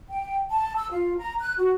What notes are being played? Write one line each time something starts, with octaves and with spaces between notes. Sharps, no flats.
G5
A5
E6
F4
A#5
F#6
F#4